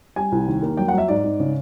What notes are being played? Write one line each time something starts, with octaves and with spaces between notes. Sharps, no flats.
G3 G#5
C2
D#2
A#3
F#3 G5
F#5
F#3 E5
G#2 D5
G#2
C#3